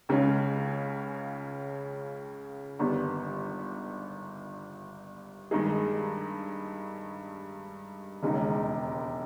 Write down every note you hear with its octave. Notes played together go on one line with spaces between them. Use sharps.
C#2 C#3 G#3 C#4
G1 G2 D#3 G3 B3
G2 D#3 G#3 D#4 G#4
E1 D#2 C#3 G#3 D#4